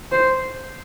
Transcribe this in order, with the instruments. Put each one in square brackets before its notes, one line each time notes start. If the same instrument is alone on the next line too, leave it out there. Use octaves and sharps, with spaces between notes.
[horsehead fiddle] C5